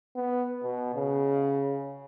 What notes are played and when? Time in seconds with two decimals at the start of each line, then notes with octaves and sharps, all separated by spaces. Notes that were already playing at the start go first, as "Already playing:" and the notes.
0.15 B3
0.64 B2
0.95 C#3